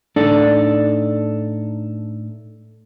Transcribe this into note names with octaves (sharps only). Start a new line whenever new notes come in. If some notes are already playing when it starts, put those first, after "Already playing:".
A2 D4 D#4 A4 D5